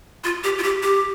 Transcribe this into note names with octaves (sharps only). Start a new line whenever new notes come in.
F4
G4
F4
G4
G4